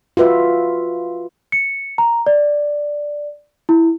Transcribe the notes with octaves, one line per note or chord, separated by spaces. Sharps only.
F4 F#4 B4 E5
C#7
A#5
D5
E4